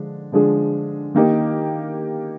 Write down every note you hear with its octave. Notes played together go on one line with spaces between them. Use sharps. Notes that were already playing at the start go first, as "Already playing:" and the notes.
Already playing: D3 F3 G#3 D4
D3 F3 G#3 D4 G#4
D#3 A#3 D#4 G4